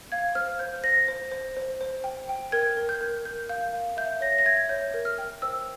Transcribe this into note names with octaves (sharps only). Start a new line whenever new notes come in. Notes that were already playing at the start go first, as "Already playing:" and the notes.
F5 G#6
C5 F6
C5 G6
C5 A#6
C5
C5
C5
C5
G5
G5
A#4 G#6
A#4
G6
A#4
A#4 G6
F5 G6
F5
E5 G6
C#5 A#6
A#6
E5 G#6
C#5 G6
A#4
F6
G5
C5 E6